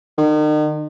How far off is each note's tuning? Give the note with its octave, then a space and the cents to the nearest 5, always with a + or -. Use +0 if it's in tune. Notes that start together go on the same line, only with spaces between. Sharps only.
D#3 -40